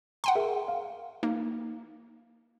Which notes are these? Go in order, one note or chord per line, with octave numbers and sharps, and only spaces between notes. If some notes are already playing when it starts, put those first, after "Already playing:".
F#5 G5 A#5 C6
G#4 A#4 E5
F5
A#3 D#4 F5